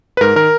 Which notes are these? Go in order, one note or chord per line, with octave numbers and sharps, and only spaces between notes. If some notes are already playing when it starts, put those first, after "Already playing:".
B4
G#2 A#4
D#3 A#4